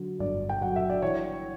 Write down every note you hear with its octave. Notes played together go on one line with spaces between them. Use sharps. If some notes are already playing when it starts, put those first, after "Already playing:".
Already playing: D3 F#3
G1 D5
G5
F#3 F#5
E5
D5
E3 C#5